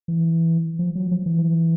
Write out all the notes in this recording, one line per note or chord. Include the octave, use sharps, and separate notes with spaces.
E3
F3
F#3
F3
E3